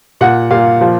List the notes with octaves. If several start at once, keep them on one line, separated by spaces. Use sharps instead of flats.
A#2 F#5
A#2 F5
F3